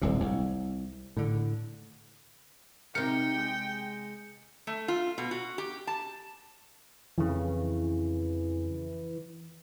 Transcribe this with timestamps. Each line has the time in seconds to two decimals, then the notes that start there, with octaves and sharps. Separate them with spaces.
0.02 D#1 C2 C3
0.20 C2
1.17 A2 D3
2.95 C3 D#4 G4 A#4 G5 C#7
3.35 G#3
4.67 A3
4.88 F4
5.18 B2
5.31 F#4
5.58 G4
5.87 A5
7.18 F2 C#3 E3